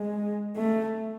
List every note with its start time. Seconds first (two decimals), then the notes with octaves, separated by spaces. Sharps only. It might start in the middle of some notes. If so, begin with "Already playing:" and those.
Already playing: G#3
0.56 A3